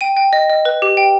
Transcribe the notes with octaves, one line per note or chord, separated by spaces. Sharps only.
G5 D#7
G5
D#5
D#5
B4
G4
G5